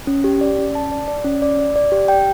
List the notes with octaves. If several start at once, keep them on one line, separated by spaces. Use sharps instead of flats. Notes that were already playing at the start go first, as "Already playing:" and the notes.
C#4
G4
D5
C#4
A5
D5
D5
C#4
D5
D5
D5
G4
G5